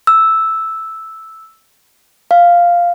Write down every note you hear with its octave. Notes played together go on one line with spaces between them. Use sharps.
E6
F5